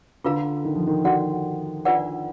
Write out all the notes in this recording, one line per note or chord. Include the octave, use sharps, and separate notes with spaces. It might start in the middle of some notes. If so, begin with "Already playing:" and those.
D3 F4 B4 F5 A#5
D#3
F3
D#3
D#3 F#4 D5 F#5
D4 F4 B4 D5 F#5